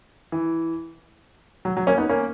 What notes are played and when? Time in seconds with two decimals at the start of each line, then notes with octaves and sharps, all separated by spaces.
0.32 E3
1.65 F#3
1.77 F#3
1.87 A#3 C#4
1.98 B3 D#4
2.09 A#3 C#4